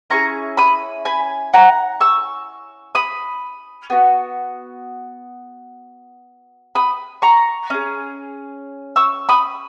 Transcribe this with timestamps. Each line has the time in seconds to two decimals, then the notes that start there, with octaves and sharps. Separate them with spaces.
0.10 C#4 E4 G#4 A#5 C#6
0.57 B5 D#6
1.05 G#5 B5
1.54 F#5 A#5
2.01 C#6 E6
2.95 B5 D#6
3.90 B3 F#4
6.75 B5 D#6
7.22 A#5 C#6
7.70 C#4 G#4
8.96 C#6 E6
9.29 B5 D#6